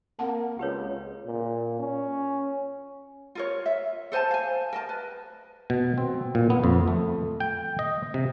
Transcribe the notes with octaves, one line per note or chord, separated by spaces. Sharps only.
A#3 C4 F#5 A5
C#2 G4 B4 C#5
A#2
C#4
F4 A#4 C#5
E5
A4 C5 G#5 A5
F5 G#5
A#4 D#5 A5
B4
B2
C4
A#2
B3
F2
A3
G5
D#5
C3